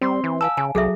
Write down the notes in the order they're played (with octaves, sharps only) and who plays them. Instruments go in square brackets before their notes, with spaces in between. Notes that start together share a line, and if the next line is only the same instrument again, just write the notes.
[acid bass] G3 [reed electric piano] C4 C6
[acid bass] E3
[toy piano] F5 G#5 A5 [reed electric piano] E6
[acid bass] C#3 [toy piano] G#5
[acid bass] C2 [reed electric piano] F#3 [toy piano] G#4 A4 E5